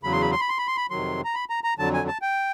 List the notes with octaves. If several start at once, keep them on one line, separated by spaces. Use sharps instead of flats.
E2 C#3 F#3 B5
C6
B5
C6
B5
C6
B5
C6
B5
F2 C3 D#3 F#3 C6
A#5
B5
A#5
A#5
F2 D3 F#3 A5
G#5
A5
G5